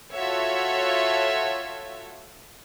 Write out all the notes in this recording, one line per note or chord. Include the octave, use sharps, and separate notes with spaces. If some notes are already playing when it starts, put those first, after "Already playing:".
F4 F#4 A4 C#5 E5